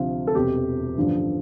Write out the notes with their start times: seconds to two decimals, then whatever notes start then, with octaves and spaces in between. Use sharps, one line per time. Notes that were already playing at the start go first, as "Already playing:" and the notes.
Already playing: D2 C3 F3 F4
0.27 A4
0.35 E1 E2 C3 G4
0.97 A1 G2 D3 F3